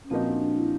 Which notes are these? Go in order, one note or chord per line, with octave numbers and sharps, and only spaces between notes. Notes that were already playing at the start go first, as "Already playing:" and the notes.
C#4
A#2 F3 A#3 C4 D#4 F#4
D4
D4
E4